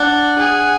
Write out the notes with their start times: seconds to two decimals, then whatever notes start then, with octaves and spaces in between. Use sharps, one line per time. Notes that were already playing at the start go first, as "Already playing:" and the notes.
Already playing: D4 F#5
0.38 G#4